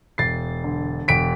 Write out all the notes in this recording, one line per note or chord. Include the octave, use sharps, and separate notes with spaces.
E1 A6 C7
D3
E1 B6 D7